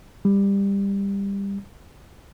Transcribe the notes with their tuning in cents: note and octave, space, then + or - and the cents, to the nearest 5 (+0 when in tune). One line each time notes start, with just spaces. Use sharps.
G3 +20